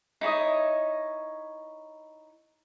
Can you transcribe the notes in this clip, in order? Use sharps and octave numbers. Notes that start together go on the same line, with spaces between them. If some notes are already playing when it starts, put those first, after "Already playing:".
D#4 E4 C#5 D#5